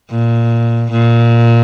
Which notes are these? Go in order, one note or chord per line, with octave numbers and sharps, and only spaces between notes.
A#2
A#2